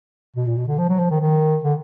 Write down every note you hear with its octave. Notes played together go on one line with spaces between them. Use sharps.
B2
A#2
B2
D3
F3
F#3
F3
D#3
D#3
D3